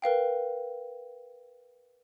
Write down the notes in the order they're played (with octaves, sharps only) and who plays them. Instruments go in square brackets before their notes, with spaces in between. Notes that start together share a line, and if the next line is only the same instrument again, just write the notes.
[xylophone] A#4 B4 F5 G5